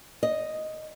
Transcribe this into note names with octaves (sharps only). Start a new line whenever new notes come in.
D#5